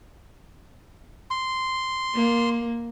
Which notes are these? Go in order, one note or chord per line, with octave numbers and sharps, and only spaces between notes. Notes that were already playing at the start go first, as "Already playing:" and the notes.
C6
A#3